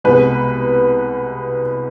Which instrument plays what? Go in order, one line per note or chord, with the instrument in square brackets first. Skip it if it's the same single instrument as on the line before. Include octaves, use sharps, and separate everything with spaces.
[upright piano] C2 B2 G#3 B4